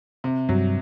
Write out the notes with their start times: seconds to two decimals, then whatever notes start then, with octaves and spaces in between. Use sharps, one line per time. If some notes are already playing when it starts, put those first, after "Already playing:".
0.24 C3
0.49 G2 F#3